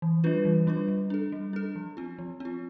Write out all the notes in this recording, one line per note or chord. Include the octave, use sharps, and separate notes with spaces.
E3
G3 D4 F4 B4
E3
G3 D4 F4 B4
G3
D4 A4
G3
D4 A4
F3
C4 F4
F3
C4 F4